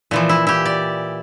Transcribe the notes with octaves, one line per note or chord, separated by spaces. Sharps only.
A#2 E3 F3
E4
E4 G4
D5